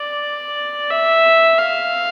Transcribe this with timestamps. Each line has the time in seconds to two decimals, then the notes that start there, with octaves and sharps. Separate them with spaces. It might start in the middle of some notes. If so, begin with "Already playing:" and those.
Already playing: D5
0.90 E5
1.58 F5